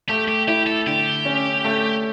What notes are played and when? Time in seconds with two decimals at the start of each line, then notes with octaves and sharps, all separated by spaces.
0.09 A3 G4
0.28 G4
0.48 E4 G4
0.67 A4
0.87 D3 G4
1.25 C#4
1.65 A3